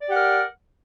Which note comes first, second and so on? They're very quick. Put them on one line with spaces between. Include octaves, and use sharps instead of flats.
D5 G4 F#5 A#4